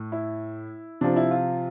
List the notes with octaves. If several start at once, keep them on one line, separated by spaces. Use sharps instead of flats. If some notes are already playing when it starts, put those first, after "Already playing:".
Already playing: A2
E4
C3 F3 D4
E4
F4